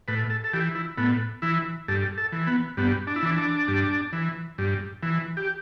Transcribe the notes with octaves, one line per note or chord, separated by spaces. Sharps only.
A2 B4
A4
A4
E3 G4
E4
A2 B3
E3 E4
G2 A4
A4
E3
B3
G2 B3
D4
E4
E3 D4
D4
G2
E3
G2
E3
G4